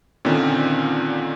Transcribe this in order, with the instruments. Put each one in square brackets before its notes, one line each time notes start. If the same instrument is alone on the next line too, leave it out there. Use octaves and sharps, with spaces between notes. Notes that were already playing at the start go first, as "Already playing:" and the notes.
[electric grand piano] A#2 D3 D#3 C4 C#4